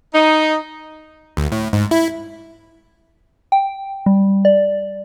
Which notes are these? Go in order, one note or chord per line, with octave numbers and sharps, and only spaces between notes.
D#4
D2
A2
G#2
E4
G5
G3
D5